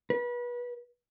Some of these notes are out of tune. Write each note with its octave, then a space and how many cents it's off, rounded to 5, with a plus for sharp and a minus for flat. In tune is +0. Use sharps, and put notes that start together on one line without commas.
B4 -30